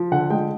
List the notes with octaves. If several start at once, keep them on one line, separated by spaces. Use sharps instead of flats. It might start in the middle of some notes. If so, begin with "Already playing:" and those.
Already playing: F3
D3 F#5
G#3 G5